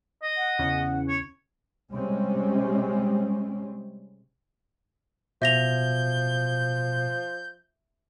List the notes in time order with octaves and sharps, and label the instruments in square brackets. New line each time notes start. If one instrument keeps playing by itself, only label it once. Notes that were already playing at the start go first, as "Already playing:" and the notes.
[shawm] D#5
[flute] F#5
[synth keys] E2 C#3 C#4
[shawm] C#5
[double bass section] C3 G3 G#3 C4 C#4
[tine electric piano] B2 [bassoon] F3 [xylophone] E5 A#6 F7 [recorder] G6